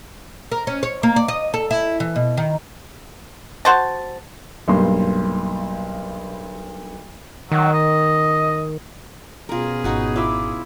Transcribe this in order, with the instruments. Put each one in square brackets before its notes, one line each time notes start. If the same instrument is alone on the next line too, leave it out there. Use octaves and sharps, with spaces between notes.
[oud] A#4
C#4
C#5
A#3
D5
D#5
A4
E4
E3
B2
D#3
[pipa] F#4 C5 A5
[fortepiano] B1 G2 A#3 C6
[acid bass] D#3 [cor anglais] F#3
[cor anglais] D#5
[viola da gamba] B2 C#4 G#4 [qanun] F4 A#4
[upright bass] G#1 [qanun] D#4 F#4 B4
[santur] E4 E5 D6 [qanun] F4